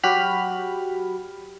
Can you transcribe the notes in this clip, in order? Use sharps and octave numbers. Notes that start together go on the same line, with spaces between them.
F#3 F#4 G4 B5 F6